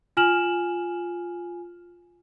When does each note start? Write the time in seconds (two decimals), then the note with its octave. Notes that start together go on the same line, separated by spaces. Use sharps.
0.17 F4 G#5 F6 E7 F#7